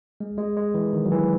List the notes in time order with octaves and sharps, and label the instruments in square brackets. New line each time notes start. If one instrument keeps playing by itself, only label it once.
[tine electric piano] G#3
G#3
G#3
E3
D#3
F#3
E3